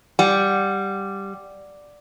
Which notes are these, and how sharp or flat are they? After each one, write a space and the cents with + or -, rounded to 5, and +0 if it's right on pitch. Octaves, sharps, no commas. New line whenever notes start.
G3 +0 F#5 -10